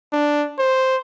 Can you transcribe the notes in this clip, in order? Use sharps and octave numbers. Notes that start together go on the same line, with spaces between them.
D4
C5